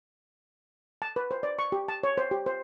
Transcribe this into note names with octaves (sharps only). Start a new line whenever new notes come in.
A5
B4
C5
D5
C#6
G4
A5
C#5
C5
G4
C5